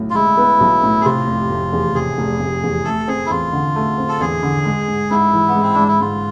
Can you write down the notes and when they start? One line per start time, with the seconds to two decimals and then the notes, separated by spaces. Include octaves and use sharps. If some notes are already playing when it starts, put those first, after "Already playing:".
Already playing: B1 A2
0.10 F4
0.15 G#3 E4
0.37 B3
0.60 B1
0.83 A2
1.01 G#4
1.05 C3 F4
1.27 F1
1.50 F1
1.73 E2
1.95 C3 G#4
2.18 F1
2.40 F1
2.63 E2
2.85 A3 A4
3.08 C4 G#4
3.26 E4
3.31 E2 F4
3.53 D3
3.76 A3
3.98 C4
4.09 A4
4.21 E2 G#4
4.43 D3
4.65 G#3
4.88 G#2
5.10 G#2 E4
5.33 E3
5.48 B3
5.55 G#3
5.62 C4
5.74 G#2 D4
5.88 E4
6.01 G#2 F4